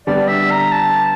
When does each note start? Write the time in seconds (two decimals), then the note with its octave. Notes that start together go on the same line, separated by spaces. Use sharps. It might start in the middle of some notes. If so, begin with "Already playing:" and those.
0.07 D3 G3 B3 D5
0.28 E5
0.51 A#5
0.72 A5